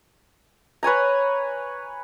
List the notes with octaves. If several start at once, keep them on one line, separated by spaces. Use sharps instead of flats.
B4 C#5 G#5 A#5